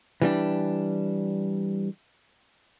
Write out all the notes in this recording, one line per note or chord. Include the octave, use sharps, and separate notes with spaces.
E3 G3 D4